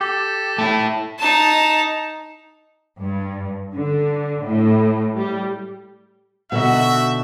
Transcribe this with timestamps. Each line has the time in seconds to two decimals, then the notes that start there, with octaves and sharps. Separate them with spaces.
0.01 G4 A4
0.58 A3 E4 A5
1.19 D#4 A5
2.99 G2
3.74 D3
4.44 A2
5.16 G3
6.52 B2 D3 D#4 F#4 E5